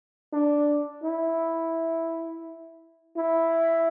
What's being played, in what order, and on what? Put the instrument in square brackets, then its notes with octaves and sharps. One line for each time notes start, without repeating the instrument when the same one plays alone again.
[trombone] D4
E4
E4